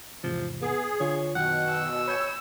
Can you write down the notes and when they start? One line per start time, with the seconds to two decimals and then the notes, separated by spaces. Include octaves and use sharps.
0.24 E2 G#2 C3 F3
0.62 B3 G#4
1.00 D3 D4 F4 C#5
1.36 F#2 B2 D#3 F#5 G5
1.70 E6
2.08 C#5 B5 G6 G#6